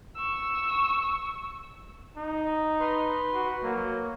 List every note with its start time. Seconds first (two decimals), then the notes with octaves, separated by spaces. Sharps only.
0.16 C#6 E6
2.17 D#4
2.80 B4 C6
3.33 F#4
3.63 F#3 A#3